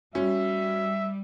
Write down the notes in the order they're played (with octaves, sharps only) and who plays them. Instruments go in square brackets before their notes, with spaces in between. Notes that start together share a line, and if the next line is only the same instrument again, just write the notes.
[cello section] G3 [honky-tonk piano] C#4 [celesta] F#4 [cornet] E5